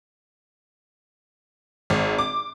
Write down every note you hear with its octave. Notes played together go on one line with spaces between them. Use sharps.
G#1
D6